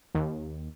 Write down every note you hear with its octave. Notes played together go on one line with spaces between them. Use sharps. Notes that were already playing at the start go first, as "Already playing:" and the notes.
D#2